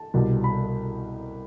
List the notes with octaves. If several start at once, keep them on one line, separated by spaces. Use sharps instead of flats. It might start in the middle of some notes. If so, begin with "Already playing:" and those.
Already playing: A5
C2 B2 G3
B5